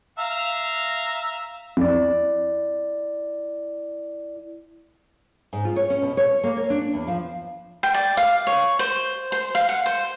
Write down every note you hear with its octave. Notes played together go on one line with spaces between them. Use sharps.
E5 F5 A#5
F2 E4 D5
G#2
F4
C#5
C#4
B2
C#5
A#3
C#5
D4
D4
E2
F3
G5
D5
F5
C#5
C5
C5
F5
F#5
C5